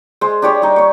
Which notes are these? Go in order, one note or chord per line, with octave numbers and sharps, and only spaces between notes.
G#3 C5
D4 G4 C#5
G3 D#4
C#5 C#6